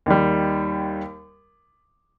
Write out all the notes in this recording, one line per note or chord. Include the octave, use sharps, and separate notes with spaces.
D#2 D#3 G3